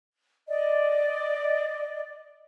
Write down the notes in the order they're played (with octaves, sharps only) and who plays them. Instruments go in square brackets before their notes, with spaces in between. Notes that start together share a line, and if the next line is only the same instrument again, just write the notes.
[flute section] D5 D#5